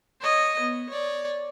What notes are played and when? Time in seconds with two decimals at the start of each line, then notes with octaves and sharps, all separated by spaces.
0.21 C#5 D#5
0.59 B3
0.89 C#5 D5